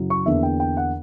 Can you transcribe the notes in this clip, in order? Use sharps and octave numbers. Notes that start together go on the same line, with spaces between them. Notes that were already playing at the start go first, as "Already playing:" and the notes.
Already playing: F#2 C#3 F#3 C#4 E4
C#6
E2 D3 A#3 D4 E5
G5
G5
F#5